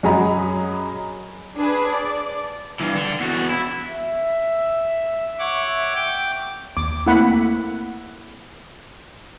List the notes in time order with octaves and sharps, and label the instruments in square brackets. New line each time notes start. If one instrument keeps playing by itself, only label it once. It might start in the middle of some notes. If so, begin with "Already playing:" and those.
[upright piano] F#2 F#4 G#4 D#5 A#5 B5
[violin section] D4 G#4 B4
D5
[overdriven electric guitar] G2 E3
D3
E2 F#4
E4
[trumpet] E5
[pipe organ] C#5 F#5 D6 [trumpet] E5
[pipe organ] G5 D6
[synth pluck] D#2 [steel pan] D6
[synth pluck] A3 A#3 C4 [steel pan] E4 F#5 B5